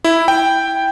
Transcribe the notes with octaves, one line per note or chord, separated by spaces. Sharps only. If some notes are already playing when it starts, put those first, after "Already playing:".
E4
G5